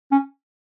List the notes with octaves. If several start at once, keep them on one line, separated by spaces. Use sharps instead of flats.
C#4